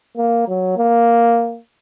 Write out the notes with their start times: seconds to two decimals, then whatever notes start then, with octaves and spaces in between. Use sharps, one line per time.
0.17 A#3
0.48 F#3
0.77 A#3